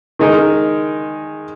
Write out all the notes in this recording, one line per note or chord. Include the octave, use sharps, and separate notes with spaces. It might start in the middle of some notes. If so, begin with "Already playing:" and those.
D#3 G#3 D#4 A#4